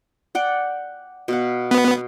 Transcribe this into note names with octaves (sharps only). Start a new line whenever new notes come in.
D5 F#5 G5
B2 F5 F#5
B3